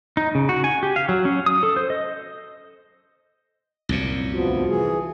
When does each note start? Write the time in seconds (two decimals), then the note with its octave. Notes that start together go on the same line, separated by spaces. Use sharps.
0.17 D#4
0.35 C#3
0.49 F#4
0.64 G#5
0.83 G4
0.96 F5
1.09 F#3
1.25 C#4
1.46 D#6
1.63 A4
1.76 C5
1.90 D#5
3.89 C2 F#2 A#2
4.33 D2 F3 B3 F4 F#4
4.69 E3 G#4